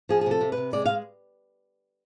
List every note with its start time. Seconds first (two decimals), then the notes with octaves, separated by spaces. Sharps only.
0.09 F3 G#4
0.21 G#4
0.26 C3 A4
0.41 C3
0.52 B4
0.57 C3
0.73 G#3 D5
0.85 G#3 F5